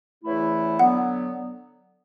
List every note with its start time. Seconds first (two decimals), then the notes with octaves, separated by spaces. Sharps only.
0.24 E2 C#3 E3 A3 E4
0.79 D3 F#3 B3 F#5